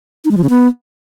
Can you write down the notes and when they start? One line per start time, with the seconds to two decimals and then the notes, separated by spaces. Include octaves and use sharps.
0.25 D#4
0.31 G#3
0.37 F3
0.43 C#3
0.50 B3